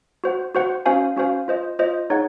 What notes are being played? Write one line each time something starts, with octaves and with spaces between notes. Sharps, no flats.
F#4 C5 F#5
F#4 C5 F#5
C#4 F#4 C5 F5 G#5
C#4 F#4 C5 F5 G#5
F4 C5 D#5
F4 C5 D#5
D#4 G#4 C#5 F#5